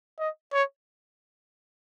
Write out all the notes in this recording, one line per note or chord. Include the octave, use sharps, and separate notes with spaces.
D#5
C#5